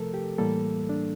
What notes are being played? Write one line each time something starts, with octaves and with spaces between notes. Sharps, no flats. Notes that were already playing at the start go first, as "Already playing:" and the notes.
Already playing: C3 F3 A3 A4 A#4
G4
A2 E3 G3 A#3 A4
D4